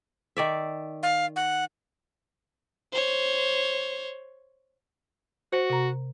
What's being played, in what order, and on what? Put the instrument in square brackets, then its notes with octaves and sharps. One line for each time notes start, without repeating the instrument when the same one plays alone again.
[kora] D#3 D5 E5
[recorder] F5
F#5
[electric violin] C5 C#5
[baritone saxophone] F#4 [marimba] C5
[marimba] C3 A#5